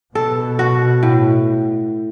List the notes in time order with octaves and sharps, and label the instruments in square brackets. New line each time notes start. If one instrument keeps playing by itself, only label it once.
[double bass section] B2 [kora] A4
[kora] F#4
A2